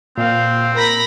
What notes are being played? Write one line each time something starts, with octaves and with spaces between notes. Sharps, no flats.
A#2 C4 F5
A#4 A#5 B5 A#6